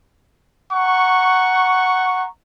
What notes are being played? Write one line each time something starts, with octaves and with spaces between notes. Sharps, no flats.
F#5 A#5 C#6